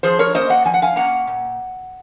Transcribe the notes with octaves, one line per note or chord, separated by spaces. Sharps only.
F3 G#4 C5
A#4 C#5
A#3 C#4 C5 D#5
D#5 F#5
F3 G#5
F#5
F5 G#5
A#3 C#4 F#5 A#5
A#2